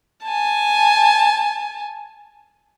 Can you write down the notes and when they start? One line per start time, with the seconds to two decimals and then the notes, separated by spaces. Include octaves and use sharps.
0.24 G#5 A5